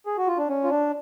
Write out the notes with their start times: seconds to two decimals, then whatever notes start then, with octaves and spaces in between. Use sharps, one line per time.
0.06 G#4
0.17 F#4
0.27 F4
0.38 D4
0.48 C#4
0.64 F4
0.70 D4